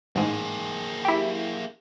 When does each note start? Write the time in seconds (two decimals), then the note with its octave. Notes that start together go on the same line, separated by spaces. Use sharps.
0.16 A1 G#2 A#3 G#4
1.05 E4 G4